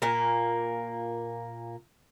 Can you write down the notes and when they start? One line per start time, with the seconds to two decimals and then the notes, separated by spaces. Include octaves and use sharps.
0.02 A#2 A#3